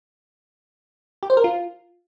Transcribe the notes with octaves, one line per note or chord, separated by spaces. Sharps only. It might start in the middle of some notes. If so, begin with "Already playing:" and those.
G4
C5
A#4
F4